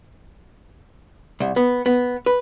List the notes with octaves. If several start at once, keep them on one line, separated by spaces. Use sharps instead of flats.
C2
B3
B3
B4